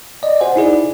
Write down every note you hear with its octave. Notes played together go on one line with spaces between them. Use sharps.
D5 D#5
F#4 C5 F#5 G#5
D#4 E4 G#4 D5